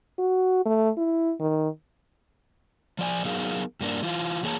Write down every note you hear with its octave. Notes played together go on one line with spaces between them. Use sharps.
F#4
A3
E4
D#3
F3 D5 G#5
F#3 B3 D#4 G#4 A#4 F5
G2 A#3 D4
E3 F4
E3 A#3 G#4 C#5 A5 A#5